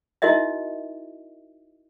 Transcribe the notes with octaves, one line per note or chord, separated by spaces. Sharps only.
D#4 E4 F#4 A#4 D#5 E5